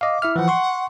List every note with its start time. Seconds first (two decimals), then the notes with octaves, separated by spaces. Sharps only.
0.01 D#5 F5 D6
0.22 E4 E5 F6
0.36 E3 F3 F#5
0.48 C6 C#6